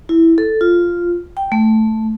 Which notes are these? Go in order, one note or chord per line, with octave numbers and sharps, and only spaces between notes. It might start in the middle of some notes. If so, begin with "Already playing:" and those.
E4
A4
F4
G5
A3